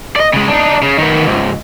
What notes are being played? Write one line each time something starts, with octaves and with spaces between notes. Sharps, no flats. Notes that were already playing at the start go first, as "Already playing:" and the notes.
D5 D#5
C#3 G#3
D4 D#4
C#3
D#3 B3
C#2 G#2